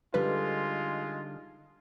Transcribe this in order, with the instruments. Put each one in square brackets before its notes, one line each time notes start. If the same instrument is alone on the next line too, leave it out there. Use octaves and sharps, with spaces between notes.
[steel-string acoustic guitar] D3 G3 D#4 [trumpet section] G#3 F4 [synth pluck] B4